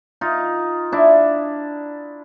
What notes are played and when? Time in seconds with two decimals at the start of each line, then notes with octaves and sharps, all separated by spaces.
0.21 D#4 F4
0.92 D4 E4